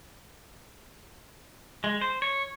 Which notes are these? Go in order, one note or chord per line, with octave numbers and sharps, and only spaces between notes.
G#3
C5
C#5